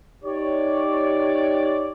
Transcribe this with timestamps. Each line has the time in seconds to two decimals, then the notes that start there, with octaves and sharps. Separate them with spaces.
0.24 D#4 G4 C#5 D5